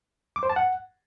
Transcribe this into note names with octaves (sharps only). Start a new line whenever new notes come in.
D6
C5
A5
F#5